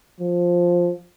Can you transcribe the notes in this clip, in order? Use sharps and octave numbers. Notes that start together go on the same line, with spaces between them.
F3